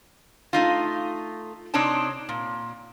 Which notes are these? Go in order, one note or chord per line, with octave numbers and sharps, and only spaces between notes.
A3 D#4 F4
C3 C4 D4 D#4 C#5 A5
A#2